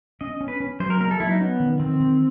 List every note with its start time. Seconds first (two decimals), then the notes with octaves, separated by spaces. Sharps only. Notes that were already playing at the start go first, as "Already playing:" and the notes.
0.21 C#4 D#5
0.41 C#4
0.48 B4
0.60 C#4
0.80 F#3 C5
0.90 A#4
1.00 A#3 A#4
1.11 A4
1.20 F#3 E4
1.31 D#4
1.40 B3 C#4
1.60 D#3
1.80 D#3 C4
2.00 D#3